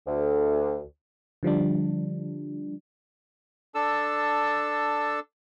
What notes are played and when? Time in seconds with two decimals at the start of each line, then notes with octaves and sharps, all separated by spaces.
0.07 D2
1.43 D3 F3 G3 D4
3.75 D4 A4 E6